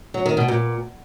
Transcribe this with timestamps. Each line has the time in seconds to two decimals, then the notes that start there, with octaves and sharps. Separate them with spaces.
0.14 F#3
0.26 D#3
0.37 B2
0.48 A#2